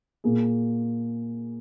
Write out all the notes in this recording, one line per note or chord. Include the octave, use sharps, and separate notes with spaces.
A#2 A#3 G#4